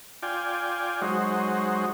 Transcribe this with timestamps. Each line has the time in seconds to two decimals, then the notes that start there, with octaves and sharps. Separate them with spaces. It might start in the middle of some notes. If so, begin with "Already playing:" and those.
0.23 F4 D5 G5 G#5
1.02 F#3 G#3 D#4 F#4 C5